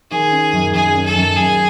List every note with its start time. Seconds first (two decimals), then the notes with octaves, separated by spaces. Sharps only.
0.11 D#3 G#4
0.31 C#4
0.53 F#2
0.73 F#2 G#4
0.95 C#4
1.06 A4
1.15 F#2
1.37 F#2 G#4